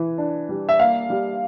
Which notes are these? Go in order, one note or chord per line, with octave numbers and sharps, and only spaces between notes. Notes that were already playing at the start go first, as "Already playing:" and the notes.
Already playing: E3
D4
G3
E5
A#3 F5
G3